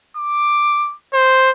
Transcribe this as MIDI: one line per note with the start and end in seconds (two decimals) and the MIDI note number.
0.17 0.95 86
1.14 1.51 72